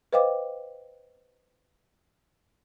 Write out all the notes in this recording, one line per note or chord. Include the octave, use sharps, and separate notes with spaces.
B4 C5 D#5 F5 G5 D6